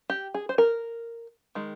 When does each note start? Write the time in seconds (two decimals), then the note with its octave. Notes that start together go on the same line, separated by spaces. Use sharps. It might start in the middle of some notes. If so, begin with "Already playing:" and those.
0.10 G4
0.34 G#4
0.49 C5
0.58 A#4
1.55 D#3 G#3